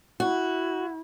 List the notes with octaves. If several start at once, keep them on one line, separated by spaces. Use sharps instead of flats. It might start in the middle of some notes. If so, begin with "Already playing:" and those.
E4 F#4